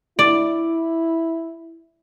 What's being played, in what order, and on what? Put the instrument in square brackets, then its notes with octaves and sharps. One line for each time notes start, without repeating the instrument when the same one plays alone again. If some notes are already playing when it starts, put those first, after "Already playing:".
[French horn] E4 [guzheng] D5